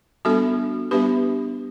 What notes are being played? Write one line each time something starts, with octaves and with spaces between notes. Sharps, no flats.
G3 B3 D4 F#4 A4
G3 B3 D4 G4 B4